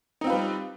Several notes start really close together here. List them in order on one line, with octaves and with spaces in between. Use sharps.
D#4 C4 F4 B4 G3